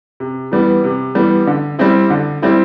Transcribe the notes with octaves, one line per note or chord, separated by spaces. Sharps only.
C3
E3 G3 B3
C3
E3 G3 B3
D3
G3 C4 E4
D3
G3 C4 E4